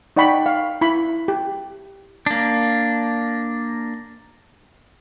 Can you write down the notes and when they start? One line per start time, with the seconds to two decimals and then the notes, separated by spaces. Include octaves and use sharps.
0.16 D#4 D5 F#5 G5 B5 C#6
0.46 F5
0.81 E4 B5
1.28 G4
2.26 A#3 D4